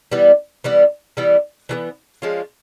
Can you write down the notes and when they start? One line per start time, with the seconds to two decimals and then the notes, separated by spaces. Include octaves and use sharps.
0.12 E3 G3 B3
0.64 E3 G3 B3
1.17 E3 G3 B3
1.69 E3 G3 B3
2.22 F3 G#3 C#4 F4